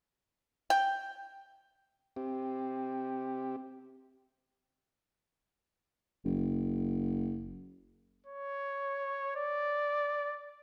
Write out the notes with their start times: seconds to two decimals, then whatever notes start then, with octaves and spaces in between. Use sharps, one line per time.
0.70 G5
2.16 C4 G4
6.25 F#1
8.26 C#5
9.36 D5